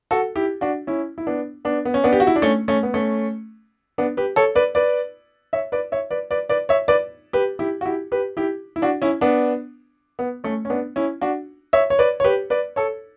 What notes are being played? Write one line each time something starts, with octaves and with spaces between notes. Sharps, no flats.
F#4 A4
E4 G4
D4 F#4
C#4 E4
E4
B3 D4
B3 D4
B3
C#4
B3 D4
G4
F#4
E4
D4
A3 C#4
A3 C#4
B3
A3 C#4
B3 D4
G4 B4
A4 C#5
B4 D5
B4 D5
C#5 E5
B4 D5
C#5 E5
B4 D5
B4 D5
B4 D5
C#5 E5
B4 D5
G4 B4
E4 G4
F#4
E4 G4
G4 B4
E4 G4
E4
D4 F#4
C#4 E4
B3 D4
B3
A3 C#4
C#4
B3 D4
C#4 E4
D4 F#4
C#5 E5
C#5
B4 D5
C#5
G4 B4
B4 D5
A4 C#5